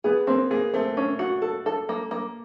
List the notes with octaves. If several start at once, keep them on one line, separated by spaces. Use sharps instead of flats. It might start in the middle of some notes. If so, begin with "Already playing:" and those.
B3 G#4
A#3 C4
A#3 G#4
A3 C4
C#4
F#4
A4
A4
A#3
A#3